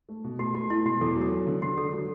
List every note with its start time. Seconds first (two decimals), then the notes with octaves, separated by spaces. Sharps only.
0.09 A3
0.24 B2
0.39 A3 F#4
0.55 A3 F#4
0.70 A3 E4
0.85 B2 F#4
1.01 E2 A4
1.16 F#3
1.21 A4
1.32 F#3
1.47 D3
1.62 D3 F#4
1.78 D4 A4
1.93 F#3